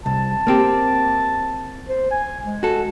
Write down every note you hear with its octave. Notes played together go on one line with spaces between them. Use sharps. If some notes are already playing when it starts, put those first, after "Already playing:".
C2 A5
A#3 C4 G4
C5
G#5
G#3
F#4 A4